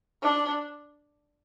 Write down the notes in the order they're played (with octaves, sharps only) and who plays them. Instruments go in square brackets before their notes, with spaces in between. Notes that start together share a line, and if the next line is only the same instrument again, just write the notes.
[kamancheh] D4